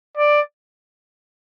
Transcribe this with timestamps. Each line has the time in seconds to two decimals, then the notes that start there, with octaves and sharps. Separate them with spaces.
0.17 D5